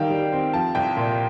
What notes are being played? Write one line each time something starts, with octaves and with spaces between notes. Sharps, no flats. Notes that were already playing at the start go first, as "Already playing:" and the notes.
Already playing: D#3 G3 F5 G5
G3
C4
F3 A5
C2 G5
A#2